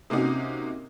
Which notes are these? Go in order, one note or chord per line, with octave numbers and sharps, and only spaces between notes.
C3 A#3 C#4 D#4 F#4